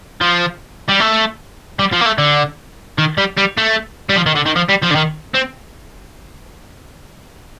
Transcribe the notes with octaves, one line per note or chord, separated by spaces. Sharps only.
F3
G3
A3
G3
F3
A#3
A3
D3
D#3
G3
G3
A3
G3
F3
D#3
D3
D#3
F3
G3
F3
D3
D#3
C4